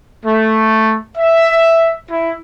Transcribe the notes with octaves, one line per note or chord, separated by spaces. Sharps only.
A3
E5
E4